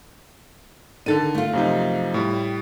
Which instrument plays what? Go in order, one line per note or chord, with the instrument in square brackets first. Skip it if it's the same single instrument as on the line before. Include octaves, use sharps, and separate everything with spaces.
[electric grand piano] D3 A6 D#7 [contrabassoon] D#3 [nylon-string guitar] D4 A4
[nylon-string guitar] A3 F4
[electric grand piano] F#2 C3 D#4 [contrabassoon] F3
[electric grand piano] A2 G3